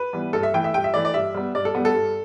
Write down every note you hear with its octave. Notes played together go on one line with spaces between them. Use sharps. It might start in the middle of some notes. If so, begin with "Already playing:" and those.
Already playing: B4
E3 G3 B3
G2 A4
E5
E3 A3 G5
E5
G2 G5
E5
E3 A3 D5
D5
G2 E5
G3 B3
G2 D5
A4
G3 B3
A4
G2